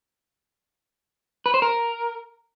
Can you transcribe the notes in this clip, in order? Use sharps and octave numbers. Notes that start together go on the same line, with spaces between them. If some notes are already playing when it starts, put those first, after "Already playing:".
B4
C5
A#4